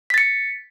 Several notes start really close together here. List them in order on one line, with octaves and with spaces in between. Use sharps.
B6 A6 C#7